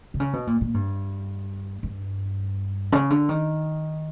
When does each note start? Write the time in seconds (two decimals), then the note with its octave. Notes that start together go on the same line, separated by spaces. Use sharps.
0.14 C3
0.20 C#3
0.33 B2
0.47 A#2
0.61 A#2
0.74 G2
1.83 G2
2.92 C#3
3.10 D3
3.29 D#3